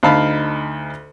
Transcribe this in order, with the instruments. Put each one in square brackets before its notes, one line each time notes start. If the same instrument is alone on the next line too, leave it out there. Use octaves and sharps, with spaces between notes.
[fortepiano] D2 D#4 F5 A5 B5